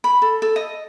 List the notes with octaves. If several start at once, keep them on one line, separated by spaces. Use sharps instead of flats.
B5
A4
A4
D#5